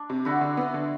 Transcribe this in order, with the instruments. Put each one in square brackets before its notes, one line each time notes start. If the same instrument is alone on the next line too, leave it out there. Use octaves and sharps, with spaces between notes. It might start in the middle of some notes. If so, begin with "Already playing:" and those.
Already playing: [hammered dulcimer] D4
[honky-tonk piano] C3
[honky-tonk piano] D3 [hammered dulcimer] E4 F#4
[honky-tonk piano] D3
B3
D3